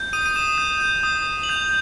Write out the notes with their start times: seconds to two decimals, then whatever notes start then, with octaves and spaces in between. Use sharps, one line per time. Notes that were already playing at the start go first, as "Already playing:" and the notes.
Already playing: G6
0.13 D#6 D#7
0.26 D#7
0.36 D#6 E7
0.58 G6
0.80 G6
1.03 D#6
1.27 D#6
1.43 F#7
1.49 G6 F7